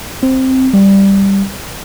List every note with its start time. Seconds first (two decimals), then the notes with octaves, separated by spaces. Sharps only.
0.23 C4
0.74 G3